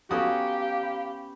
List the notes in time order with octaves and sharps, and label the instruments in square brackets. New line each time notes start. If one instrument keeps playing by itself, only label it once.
[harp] B3 C#4 A#5 [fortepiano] F#4 A4 D#6 [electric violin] G4 [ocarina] F5
[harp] B5